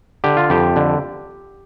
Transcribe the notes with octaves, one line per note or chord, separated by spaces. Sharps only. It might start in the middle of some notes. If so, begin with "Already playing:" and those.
D3 G4
F4
F2 G4
D3